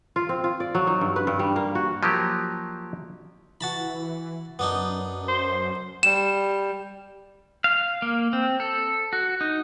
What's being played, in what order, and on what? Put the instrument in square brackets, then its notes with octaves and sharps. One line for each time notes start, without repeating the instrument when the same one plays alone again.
[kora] F4
C4
F4
D5
F#3
D#4
G2
B4
G2
G3
A#3
F#4
[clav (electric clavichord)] F3 F#3 A#3 G4
[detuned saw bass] E3 [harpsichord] F#4 A5 B5
[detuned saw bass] F#2 [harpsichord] B3 D4 D#4
[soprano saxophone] C5
[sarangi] G3 [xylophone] E7
[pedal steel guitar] F5
A#3
C4
A4
F#4
D#4